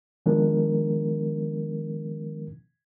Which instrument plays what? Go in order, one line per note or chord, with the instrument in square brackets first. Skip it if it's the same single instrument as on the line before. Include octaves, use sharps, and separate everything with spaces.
[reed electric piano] D#3 F3 G#3 B3 D4 A#4